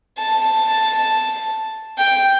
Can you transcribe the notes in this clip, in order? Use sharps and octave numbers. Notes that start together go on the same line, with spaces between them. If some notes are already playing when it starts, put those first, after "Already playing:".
A5
G5